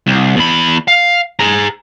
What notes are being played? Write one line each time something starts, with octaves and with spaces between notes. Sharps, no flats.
C2
E2 B5
F5
G#4 A#5